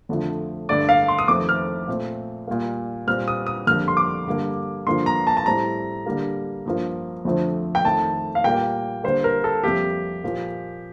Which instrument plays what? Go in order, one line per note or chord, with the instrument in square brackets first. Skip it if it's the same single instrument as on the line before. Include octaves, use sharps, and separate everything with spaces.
[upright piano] F2 D3 F3 A3
G2 D3 A3 D5
F5
C6
D#6
F2 C3 D#3 A3 C4 D6
F6
A#2 A3 C4
A#2 G3 A#3
A#2 G3 C4 F6
D#6
D#6
F2 D3 G3 A#3 F6
C6
D6
G2 D3 G3 A#3
G2 D3 F3 A#3 C6
A#5
A5
A5
A2 G3 C4 A#5
D3 G3 A#3
G2 F3 A#3
F2 D3 F3 A3 C4
G5
F2 D#3 A3 A5
F5
A#2 G3 A#3 G5
D3 G3 A#3 C5
A#4
A4
F2 C3 G3 A#3 G4
A#2 F3 A#3